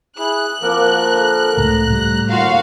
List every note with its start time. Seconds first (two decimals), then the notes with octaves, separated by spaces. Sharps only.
0.18 E4 G#4 F#6
0.62 F3 A#3 C4 F#4 A#4
1.13 D3
1.57 C#2 A2 A#5
1.90 A2 G3
2.30 D#2 F4 F#4 F5